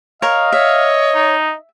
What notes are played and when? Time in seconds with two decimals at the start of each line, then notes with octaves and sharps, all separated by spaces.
0.22 A#4 C#5 D#5 F5
0.52 C#5 E5
1.14 D#4